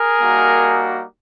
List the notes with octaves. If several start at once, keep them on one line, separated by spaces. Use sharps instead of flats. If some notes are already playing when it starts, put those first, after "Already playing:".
Already playing: G#4 A#4
G3 A#3 D#4 F#4